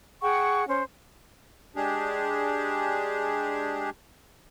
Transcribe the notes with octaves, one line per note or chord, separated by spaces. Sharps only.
G#4 F#5 G5 C#6
C#4 C5
G#3 D4 G4 G#4